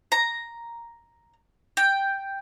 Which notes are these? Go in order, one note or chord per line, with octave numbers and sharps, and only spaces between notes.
A#5
G5